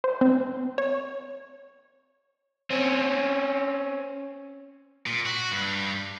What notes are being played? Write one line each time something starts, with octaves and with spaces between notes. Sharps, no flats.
C5
C4
C#5
C4 C#4
A#2
F#4
G2